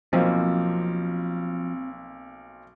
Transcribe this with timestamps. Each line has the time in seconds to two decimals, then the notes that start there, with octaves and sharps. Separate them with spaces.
0.13 B1 F3 A#3 C4